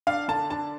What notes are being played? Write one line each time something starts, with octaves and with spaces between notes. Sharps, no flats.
D4 F5
D3 A5
D4 A5